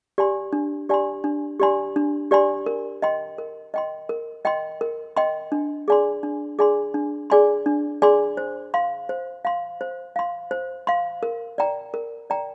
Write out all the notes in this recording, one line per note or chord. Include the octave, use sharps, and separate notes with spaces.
G4 D5 G#5 C6
D4
G4 D5 G#5 C6
D4
G4 D5 G#5 C6
D4
G4 D5 G#5 C6
A#4
D#5 G5 C6
A#4
D#5 G5 C6
A#4
D#5 G5 C6
A#4
D#5 G5 C6
D4
G#4 D5 G#5 C6
D4
G#4 D5 G#5 C6
D4
G#4 D5 G#5 C6
D4
G#4 D5 G#5 C6
C5
F5 C6
C5
F5 C6
C5
F5 C6
C5
F5 C6
A#4
D5 G5 A#5
A#4
D5 G5 A#5